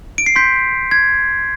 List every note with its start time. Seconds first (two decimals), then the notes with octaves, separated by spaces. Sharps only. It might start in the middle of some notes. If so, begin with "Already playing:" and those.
0.18 D7
0.26 C7
0.36 C6 G6 B6
0.91 G#6